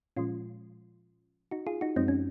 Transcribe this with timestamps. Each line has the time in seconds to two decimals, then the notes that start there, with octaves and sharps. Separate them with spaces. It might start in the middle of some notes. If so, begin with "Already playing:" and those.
0.16 A#2 F3 G#3 C#4 F4
1.51 D#4 F#4
1.67 F4 G#4
1.81 D#4 F#4
1.96 F#2 F3 G#3 C4 D#4
2.08 C#4